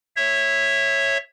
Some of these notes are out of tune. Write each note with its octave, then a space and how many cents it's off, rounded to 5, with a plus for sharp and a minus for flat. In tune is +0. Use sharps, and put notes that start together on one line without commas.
C#5 -15 E5 +0